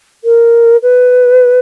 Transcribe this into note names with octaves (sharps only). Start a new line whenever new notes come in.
A#4
B4